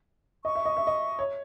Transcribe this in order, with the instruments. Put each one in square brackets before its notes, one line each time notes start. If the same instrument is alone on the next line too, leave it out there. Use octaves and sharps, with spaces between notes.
[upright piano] D#5 [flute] C#6
[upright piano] E5
D#5
E5
D#5
C#5